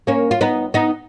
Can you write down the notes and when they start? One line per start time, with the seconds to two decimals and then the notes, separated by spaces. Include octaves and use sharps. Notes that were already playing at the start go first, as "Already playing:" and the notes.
0.07 A#3 C#4
0.31 F4
0.41 B3 D#4
0.74 B3 D#4